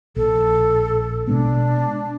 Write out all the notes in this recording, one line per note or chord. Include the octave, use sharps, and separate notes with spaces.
A#1 A4
B2 G#3 B3 D4